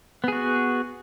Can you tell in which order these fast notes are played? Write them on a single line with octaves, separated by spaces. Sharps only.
B3 G#4 F#4